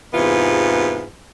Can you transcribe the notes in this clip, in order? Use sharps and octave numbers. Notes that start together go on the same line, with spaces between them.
E2 G#2 C3 E3 B3 F4